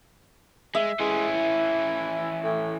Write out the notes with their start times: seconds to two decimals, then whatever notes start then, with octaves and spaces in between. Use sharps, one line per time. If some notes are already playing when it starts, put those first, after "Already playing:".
0.75 G#3 E5
0.99 E3 G#3 C#4
1.35 E4
2.44 A2